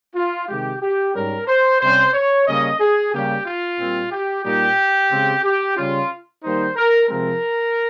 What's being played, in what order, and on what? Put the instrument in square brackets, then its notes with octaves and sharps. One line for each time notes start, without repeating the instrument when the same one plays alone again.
[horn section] F4
C3 D#3 G#3 G4
G4
G#2 G3 C#4 A#4
C5
C3 G3 C#4 C5
C#5
C#3 G3 A#3 C#4 D#5
G#4
C#3 G3 A#3 C#4 G4
F4
A#2 G3 C4
G4
A#2 G3 A#3 D#4 G4
C#3 G#3 C4
G4
C#3 G3 C#4 F4
D#3 G3 A#3 D#4 C5
A#4
C3 F3 G#3 C4 A#4